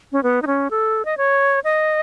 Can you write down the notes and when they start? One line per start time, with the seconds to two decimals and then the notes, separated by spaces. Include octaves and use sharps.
0.12 C#4
0.23 B3
0.42 D#4
0.47 C#4
0.71 A4
1.05 D#5
1.17 C#5
1.64 D#5